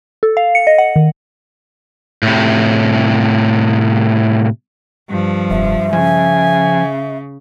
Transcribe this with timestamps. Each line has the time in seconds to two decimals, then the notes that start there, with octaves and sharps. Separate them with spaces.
0.23 A4
0.37 F5
0.55 C#7
0.67 D#5
0.78 F#5
0.96 D#3
2.23 A2 C3
5.09 G2 F3
5.50 F1 E5
5.93 C#3 F3 G#5